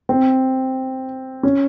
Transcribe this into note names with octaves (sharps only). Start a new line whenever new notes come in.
C4
C#4